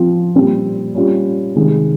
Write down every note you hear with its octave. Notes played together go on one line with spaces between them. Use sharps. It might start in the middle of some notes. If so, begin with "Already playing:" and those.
Already playing: F3 C4 F4
A#2 G3 C4
G3 C#4 F4
C3 D#3 G#3